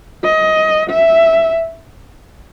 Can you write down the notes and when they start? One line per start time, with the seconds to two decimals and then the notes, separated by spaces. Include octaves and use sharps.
0.24 D#5
0.90 E5